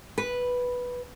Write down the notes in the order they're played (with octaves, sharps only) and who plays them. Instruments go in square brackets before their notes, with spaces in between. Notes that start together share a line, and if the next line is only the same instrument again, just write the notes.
[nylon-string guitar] B4